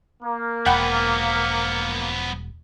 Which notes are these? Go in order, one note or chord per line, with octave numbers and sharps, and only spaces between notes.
A#3
E1 F3 B3 F#5 G5 B5